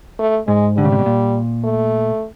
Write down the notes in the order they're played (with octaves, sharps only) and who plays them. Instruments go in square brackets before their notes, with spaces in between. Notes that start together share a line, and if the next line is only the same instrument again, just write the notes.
[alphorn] A3
[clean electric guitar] G#2 [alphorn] G#3
[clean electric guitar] D3 [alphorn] G3
[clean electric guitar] C#3
C3
B2
A#2
[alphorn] A3